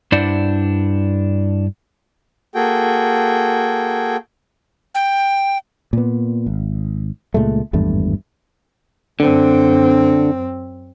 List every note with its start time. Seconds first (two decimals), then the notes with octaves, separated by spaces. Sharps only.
0.12 G2 D4 E4 C5 D5 F#5
2.54 A#3 F#4 G#4 A4 G5
4.95 G5
5.93 A#2 B3
6.46 G#1
7.34 C#2 A#2 G#3 A3
7.73 G#1 E2 G2 A3
9.20 F#2 D3 C4